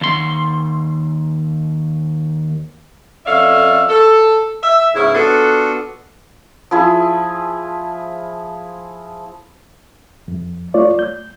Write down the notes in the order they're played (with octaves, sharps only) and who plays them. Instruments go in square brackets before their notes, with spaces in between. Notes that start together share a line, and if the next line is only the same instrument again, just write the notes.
[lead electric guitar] D#2 C6
[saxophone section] F2 C#4 A4 D5 E5 F5
A4
E5
G#2 C#3 B3 E4
B3 D4 F4 F#4 A4
[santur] F3 E4 G#4 B5
[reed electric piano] F2
A3 F4 C#5 D5
G6